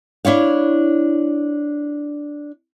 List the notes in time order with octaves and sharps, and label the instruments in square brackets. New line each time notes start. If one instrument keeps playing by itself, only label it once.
[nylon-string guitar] D4 E4 C#5 F5